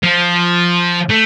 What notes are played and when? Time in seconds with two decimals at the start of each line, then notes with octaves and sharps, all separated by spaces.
0.03 F3
1.09 A3